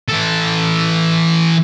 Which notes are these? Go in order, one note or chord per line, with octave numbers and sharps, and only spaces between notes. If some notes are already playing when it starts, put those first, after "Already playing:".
E3 A4